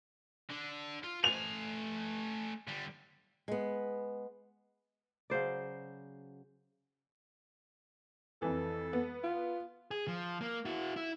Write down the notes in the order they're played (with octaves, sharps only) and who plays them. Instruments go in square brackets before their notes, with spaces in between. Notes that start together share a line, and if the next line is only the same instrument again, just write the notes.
[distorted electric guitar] D3
F4
[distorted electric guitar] A3 G#5 [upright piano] F7
[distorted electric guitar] D3 G3
[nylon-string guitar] G#3 B3
[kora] C#3 F#3 C5 D5
[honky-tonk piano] F2 E3 [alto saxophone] A4
[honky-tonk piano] B3
[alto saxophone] F4
[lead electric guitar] G#4
F3
A#3
E4 F#4
E4